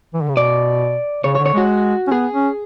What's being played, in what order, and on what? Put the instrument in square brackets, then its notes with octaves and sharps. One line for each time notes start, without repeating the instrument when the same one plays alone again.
[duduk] E3
D3
C#3
[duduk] B2 [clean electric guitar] D5
[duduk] C#3 [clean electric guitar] C#5
[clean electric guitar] C#5
[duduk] D3
[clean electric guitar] C#5
[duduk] G#3 [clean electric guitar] F#4
[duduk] C#4
[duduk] B3 [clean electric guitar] G#4
[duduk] C#4